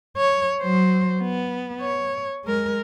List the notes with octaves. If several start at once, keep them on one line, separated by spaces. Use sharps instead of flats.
C#5
F#3 C5
B3
C#5
G#3 A#4